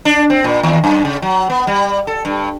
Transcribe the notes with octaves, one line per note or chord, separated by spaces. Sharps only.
D4
C4
A#2
D#2
F#2
C#3
F#3
B3
G3
A4
G2